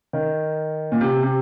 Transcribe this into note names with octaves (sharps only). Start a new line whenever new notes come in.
D#3
A#2
C3
C3